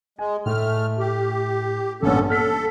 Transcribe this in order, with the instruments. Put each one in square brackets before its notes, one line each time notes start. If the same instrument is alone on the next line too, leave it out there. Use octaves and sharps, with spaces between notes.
[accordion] G#3 [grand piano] G#5
[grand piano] A2 [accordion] A3 F6
[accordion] G4
[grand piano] A1 G2 A#2 [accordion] B3 C#4 A4
[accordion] A4 [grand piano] F6 B6